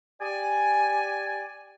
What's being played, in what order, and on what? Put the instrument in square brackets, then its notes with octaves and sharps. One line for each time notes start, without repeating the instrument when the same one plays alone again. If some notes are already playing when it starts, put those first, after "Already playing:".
[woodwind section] G4 D5 G#5